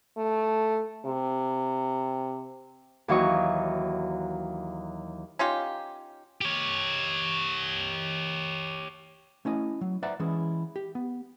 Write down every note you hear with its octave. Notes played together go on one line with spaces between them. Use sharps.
A3
C3
D#2 E3 F#3 D#5 C#6
C#4 D#4 F4 G4
G4 C#5
A3 C#4 E4 D#5
F#3
B4 C5 D5 E5 F#5 A#5
E3 G#3 C#4 E4 G#4
G4
B3